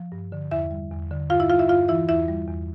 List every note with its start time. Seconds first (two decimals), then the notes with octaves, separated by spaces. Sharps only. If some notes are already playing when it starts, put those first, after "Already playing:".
Already playing: F3
0.12 G2
0.32 D3
0.51 E2 E4 E5
0.71 G3
0.91 E2
1.11 D3
1.30 G2 F4 F5
1.40 E4 E5
1.50 G3 F4 F5
1.59 E4 E5
1.69 G2 F4 F5
1.88 E3 E4 E5
2.09 E2 E4 E5
2.28 G3
2.48 E2